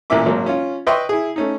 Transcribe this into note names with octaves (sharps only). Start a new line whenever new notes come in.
A1 A#2 E3 A#3 E5 D6
G#1 F#3 A#3
C#4 F4
B4 D#5 E5 G5 C6 C#6
E4 G#4
A3 C#4 D#4